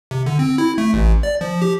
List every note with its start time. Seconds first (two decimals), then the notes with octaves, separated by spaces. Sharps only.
0.11 C3
0.26 D3
0.39 C4
0.58 E4
0.78 A3
0.94 A1
1.23 D5
1.41 F3
1.62 G4